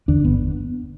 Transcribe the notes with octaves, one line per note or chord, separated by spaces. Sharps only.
E2 D3 D4
G1 B3